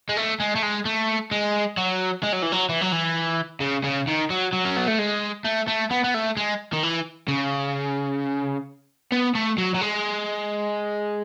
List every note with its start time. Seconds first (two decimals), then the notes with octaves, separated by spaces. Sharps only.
0.09 G#3
0.17 A3
0.40 G#3
0.55 A3
0.63 G#3
0.85 A3
1.31 G#3
1.77 F#3
2.23 G#3
2.32 F#3
2.42 E3
2.52 F#3
2.69 E3
2.81 F#3
2.92 E3
3.61 C#3
3.84 C#3
4.07 D#3
4.30 F#3
4.53 F#3
4.65 C#4
4.77 B3
4.88 A3
4.99 G#3
5.44 A3
5.68 A3
5.91 B3
6.04 B3
6.14 A3
6.37 G#3
6.73 D#3
6.83 E3
7.28 C#3
9.12 B3
9.35 A3
9.58 F#3
9.75 F#3
9.81 G#3